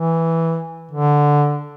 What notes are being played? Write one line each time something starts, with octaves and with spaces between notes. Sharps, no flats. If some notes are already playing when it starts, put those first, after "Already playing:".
Already playing: E3
D3